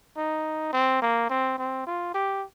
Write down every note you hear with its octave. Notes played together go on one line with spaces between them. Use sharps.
D#4
C4
A#3
C4
C4
F4
G4